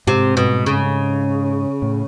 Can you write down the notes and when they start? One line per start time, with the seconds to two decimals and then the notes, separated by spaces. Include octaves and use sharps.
0.07 G#2 C3
0.37 B2
0.66 C#3
1.82 A2